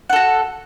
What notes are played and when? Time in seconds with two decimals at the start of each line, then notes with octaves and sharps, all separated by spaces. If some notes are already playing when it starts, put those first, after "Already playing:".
0.10 F#5
0.13 A4
0.16 F#4